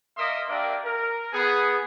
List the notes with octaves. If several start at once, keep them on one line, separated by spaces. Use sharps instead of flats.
A#3 A#4 D#5 E5 C6 D#6
A#3 D4 G4 A#4 E5
A#4
B3 G#4